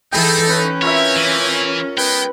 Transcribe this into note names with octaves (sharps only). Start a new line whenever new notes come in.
E3 D#4 G#4 A4 G5 B5
C#4 B4
C4 E4 F4 A#4 C#5 E5
E3
G#3 B3 B4 G5